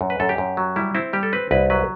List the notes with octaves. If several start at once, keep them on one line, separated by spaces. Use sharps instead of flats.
F#2
B4
F#2 A4
G4
F#2
F#3
G3 E4
C4 E4
G3 G4
A4
C4 B4
C2 B4
F#3 B4